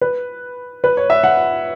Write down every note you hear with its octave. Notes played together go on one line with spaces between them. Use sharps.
B4
B4
C#5
E5
F#5